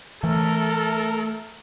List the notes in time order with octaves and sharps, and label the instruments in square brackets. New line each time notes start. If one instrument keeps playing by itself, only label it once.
[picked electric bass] E3 [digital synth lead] A3 [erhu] A4 [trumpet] A#4